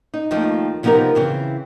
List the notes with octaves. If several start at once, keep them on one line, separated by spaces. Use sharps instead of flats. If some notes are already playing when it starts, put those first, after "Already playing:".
D#4
D#2 D#3 F3 A3 D#4
C3 F3 B3 D#4 G4 A#4
C#3 E3 C4